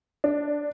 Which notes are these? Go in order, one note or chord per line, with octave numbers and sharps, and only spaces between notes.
D4